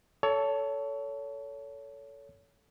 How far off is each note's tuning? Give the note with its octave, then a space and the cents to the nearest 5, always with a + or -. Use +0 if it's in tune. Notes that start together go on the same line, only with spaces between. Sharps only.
A4 +0 C#5 +25